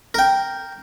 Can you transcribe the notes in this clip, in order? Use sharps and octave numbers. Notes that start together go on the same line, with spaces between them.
A#4 G5